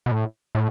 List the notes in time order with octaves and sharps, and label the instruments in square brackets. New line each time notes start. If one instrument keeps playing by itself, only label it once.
[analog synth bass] B2
A2
A2